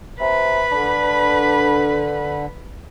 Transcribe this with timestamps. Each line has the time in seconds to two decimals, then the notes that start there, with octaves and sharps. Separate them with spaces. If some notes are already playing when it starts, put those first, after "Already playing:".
0.21 C3 B4 B5
0.72 D3 D4